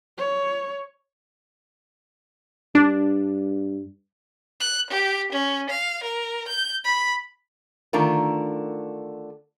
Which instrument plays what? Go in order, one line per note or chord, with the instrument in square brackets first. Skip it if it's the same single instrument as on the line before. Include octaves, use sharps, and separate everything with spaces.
[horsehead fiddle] C#5
[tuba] G2 [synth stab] D4
[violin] F#6
G4
C#4
F5
A#4
G6
B5
[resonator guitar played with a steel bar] D3 D#3 A3 D4 F4 A#4